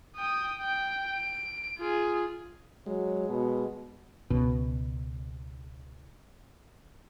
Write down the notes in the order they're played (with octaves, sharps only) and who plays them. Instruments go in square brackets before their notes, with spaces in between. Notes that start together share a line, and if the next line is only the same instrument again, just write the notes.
[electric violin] G5 D#6
G5
D7
F4 G#4
[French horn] F#3 [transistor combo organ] G#3
[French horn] B2
[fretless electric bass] C#2 B2